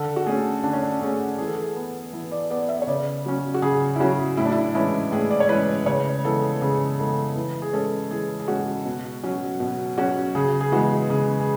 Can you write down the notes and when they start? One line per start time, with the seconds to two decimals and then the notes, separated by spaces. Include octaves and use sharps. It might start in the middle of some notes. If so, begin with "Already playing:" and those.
Already playing: D3 A4
0.16 F#4
0.26 A3 C#4 G#4
0.63 D3 D4
0.73 C#4
0.82 D4
1.01 A3 C#4 G#4
1.38 E3 G#4
1.47 A4
1.56 G#4
1.76 B3
2.13 E3
2.32 D5
2.51 B3 D5
2.69 E5
2.82 C#5
2.87 C#3 D5
3.26 F#3 C#4
3.54 F#4
3.62 C#3 G#4
3.96 E4
4.00 F#3 C#4 F#4
4.37 A2 E4
4.45 D4
4.52 E4
4.74 E3 G#3 C#4 E4
5.12 A2 G#4
5.31 D5
5.40 C#5
5.49 E3 G#3 C#4 B4
5.86 C#3 C#5
6.24 E3 G#3 B3 A4
6.61 C#3 G#4
6.99 E3 G#3 B3 A4
7.36 E3
7.62 G#4
7.73 G#3 C#4 A4
8.11 E3 G#4
8.39 G#4
8.48 G#3 C#4 F#4
8.85 B2
9.24 F#3 C#4
9.60 B2
9.98 F#3 C#4 F#4
10.35 C#3 G#4
10.61 G#4
10.72 E3 G#3 B3 F#4
11.10 C#3 G#4
11.40 G#4